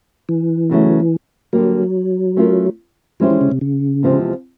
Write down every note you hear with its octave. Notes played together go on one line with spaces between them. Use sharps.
E3
E2 C#3 F#3 A3
D3 F#3 G3 A#3
A3 C#4 F4 A#4
F3 G#3 C#4 E4 G4 C5
E3
C#3
C3
C#3
E2 C3 F3 G#3 C4